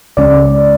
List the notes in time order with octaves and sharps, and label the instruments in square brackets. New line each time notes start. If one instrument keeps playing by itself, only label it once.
[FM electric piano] C#2 C#3 G#3 C#4 D5